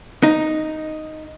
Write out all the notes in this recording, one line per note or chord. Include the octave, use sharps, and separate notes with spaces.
D#4